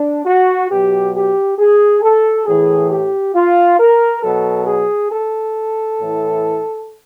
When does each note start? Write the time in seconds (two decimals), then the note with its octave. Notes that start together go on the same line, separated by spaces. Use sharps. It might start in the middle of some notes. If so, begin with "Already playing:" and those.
Already playing: D4
0.25 F#4
0.69 B2 F#3 G4
1.13 G4
1.58 G#4
2.02 A4
2.46 A2 E3 G#4
2.90 G4
3.34 F4
3.78 A#4
4.22 B2 F#3 A4
4.67 G#4
5.11 A4
5.99 A2 E3